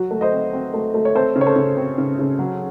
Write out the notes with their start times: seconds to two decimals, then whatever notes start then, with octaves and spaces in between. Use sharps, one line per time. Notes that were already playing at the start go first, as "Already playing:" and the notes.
Already playing: F#3 F#4
0.11 A3
0.21 C5 D#5
0.32 C4
0.53 C4
0.74 A3
0.94 A3
1.05 C#5
1.15 C4 A4 C5
1.36 C#3
1.41 C#5
1.46 A4 C5
1.56 C#3
1.77 C4
1.98 C#3
2.19 C#3
2.39 F#3